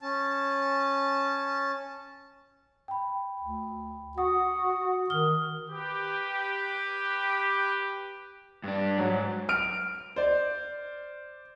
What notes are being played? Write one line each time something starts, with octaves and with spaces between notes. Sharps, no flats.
C#4 A5
G5 B5
D2
F#4 F#5 D#6
D#3 D#6 F6 G7
G4 B4
G2 D4
G#2 F#3
F6 D7
C5 D5